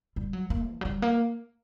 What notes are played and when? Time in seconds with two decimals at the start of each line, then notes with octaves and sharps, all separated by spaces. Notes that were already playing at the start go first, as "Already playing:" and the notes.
0.16 G3
0.33 F#3
0.50 A#3
0.67 E3
0.81 F#3
0.85 G3
1.02 A#3